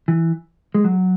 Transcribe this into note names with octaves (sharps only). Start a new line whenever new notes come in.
E3
G#3
F#3